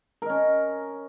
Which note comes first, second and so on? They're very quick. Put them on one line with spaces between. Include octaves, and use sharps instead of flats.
A#4 D#5 C#4